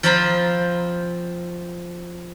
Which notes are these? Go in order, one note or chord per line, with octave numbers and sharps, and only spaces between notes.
F3 C4 F4 C5 A#5 B5